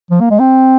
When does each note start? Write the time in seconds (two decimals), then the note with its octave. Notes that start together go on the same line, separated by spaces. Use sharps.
0.11 F3
0.21 A#3
0.31 G#3
0.40 C4